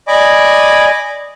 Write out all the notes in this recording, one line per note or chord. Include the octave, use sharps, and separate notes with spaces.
D5 D#5 G#5 B5 D6